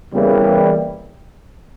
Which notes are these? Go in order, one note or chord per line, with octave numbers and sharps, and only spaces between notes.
E2 C#3 E3 G3 A#3